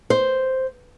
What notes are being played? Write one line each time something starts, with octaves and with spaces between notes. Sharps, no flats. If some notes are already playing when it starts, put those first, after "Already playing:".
C5